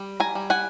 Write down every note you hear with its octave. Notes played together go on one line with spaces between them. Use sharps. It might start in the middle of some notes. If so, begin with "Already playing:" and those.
Already playing: G3
G#5 A#5
G3
F#5 G#5